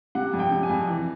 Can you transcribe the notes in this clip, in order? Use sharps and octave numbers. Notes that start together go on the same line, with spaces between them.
C3 F#5
F2
G5
C3
G#5
F2
E3